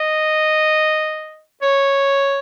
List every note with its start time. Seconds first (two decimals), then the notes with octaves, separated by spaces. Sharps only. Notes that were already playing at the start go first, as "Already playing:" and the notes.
Already playing: D#5
1.62 C#5